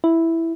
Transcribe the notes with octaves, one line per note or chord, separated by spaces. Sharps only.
E4